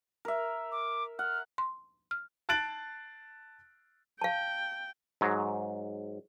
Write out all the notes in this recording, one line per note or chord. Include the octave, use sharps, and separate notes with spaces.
A#4 E5
D6
F#5 F6
C6
F6
A5 F#6 A6 D7 F#7
F5 G5 A5
G#2 F#3